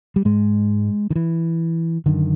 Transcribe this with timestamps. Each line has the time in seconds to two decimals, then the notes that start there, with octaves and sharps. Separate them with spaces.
0.16 G3
0.25 G#2 G#3
1.10 D#3
1.16 E3
2.06 F#2 D3 D#3